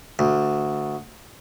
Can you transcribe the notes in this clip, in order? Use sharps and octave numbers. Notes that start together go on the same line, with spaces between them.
D2